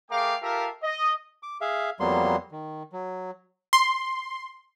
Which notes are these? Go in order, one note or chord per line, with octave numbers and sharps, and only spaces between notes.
A3 G#4 A#4 F5 G5 D6
F4 G4 A4 A#4 E5 F5
D#5
D6
G#4 E5 F5
F2 F#3 G3 A#3 B3 C6
D#3
F#3
C6